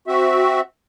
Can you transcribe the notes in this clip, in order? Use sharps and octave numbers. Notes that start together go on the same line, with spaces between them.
C4 F#4 E5